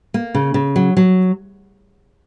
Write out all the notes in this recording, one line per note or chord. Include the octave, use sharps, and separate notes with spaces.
A#3
C#3
C#3
F#3
F#3